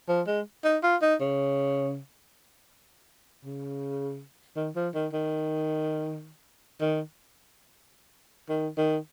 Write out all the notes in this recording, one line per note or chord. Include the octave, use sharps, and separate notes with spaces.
F3
G#3
D#4
F4
D#4
C#3
C#3
D#3
F3
D#3
D#3
D#3
D#3
D#3